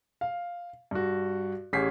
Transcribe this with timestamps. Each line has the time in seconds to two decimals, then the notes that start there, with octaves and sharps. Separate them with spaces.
0.21 F5
0.91 G2 F#4
1.73 A1 C#4 G4 G#4 B6 C7